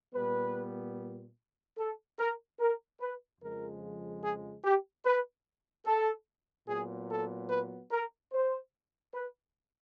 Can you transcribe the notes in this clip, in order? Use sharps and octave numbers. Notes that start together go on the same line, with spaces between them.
A#2 G3 B3 B4
A4
A#4
A#4
B4
F2 C#3 F3 G#3 A#4
G#4
G4
B4
A4
A#2 F#3 B3 G#4
A4
B4
A#4
C5
B4